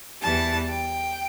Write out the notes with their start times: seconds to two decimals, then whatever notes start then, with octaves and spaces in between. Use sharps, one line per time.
0.22 E2 E3 G3 A5
0.69 G5